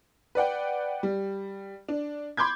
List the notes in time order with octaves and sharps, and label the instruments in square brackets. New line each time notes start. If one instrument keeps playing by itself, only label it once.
[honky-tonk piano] B4 D5 F#5 G5
G3
D4
B5 C6 D6 G6 G#6